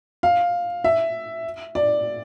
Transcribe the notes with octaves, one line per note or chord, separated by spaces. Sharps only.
F5
E5
D5